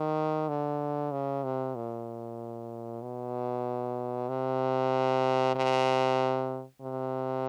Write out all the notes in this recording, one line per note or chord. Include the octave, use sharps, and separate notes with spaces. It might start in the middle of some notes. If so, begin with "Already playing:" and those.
Already playing: D#3
D3
C#3
C3
A#2
B2
C3
C3
C3